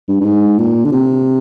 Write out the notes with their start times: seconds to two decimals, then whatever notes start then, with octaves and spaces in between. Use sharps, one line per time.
0.08 G2
0.21 G2
0.25 G#2
0.58 A#2
0.85 D3
0.92 C3